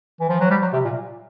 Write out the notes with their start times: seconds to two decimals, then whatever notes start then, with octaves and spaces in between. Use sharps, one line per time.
0.20 E3
0.29 F3
0.40 F#3
0.50 G3
0.62 F#3
0.73 C3
0.85 A#2